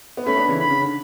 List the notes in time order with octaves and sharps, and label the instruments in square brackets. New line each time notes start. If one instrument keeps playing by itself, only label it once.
[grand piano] B3
[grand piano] A3 C#4 [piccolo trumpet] B5
[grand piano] B3 D4
C#3 E3
[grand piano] D3 [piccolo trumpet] B5
[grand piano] C#3
D3